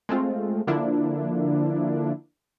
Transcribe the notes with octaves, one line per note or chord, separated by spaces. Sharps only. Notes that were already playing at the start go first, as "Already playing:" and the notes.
G#3 A3 C4 F4
D3 F3 A#3 D4 E4